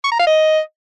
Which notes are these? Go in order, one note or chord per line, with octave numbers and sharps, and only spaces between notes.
C#6
A#5
F5
D#5